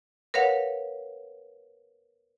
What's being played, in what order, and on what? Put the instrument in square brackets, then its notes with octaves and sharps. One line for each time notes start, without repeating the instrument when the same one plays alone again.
[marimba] A#4 B4 C#5 F5 F#5